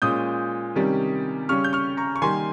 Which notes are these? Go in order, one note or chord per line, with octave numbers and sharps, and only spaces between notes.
A#2 G#3 C#4 D#6 G6
C3 D#3 G3 C#4
C#3 G3 C#4 C#6 F6
G6
C#6 F6
A#5 C#6
C#6
D#3 G3 A#3 G#5 C6